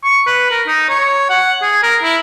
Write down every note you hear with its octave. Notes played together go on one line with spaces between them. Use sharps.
C#6
B4
A#4
D#4
C#5
F#5
G#4
A#4
E4